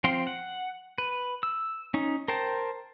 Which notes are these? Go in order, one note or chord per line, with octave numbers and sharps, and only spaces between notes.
F3 C4 F5 G5 C6
F#5
B4
E6
C#4 D#4
A#4 C5 G5 A5